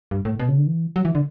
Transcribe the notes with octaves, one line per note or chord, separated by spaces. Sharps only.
G2
A2
B2
C#3
D3
E3
F#3
E3
D3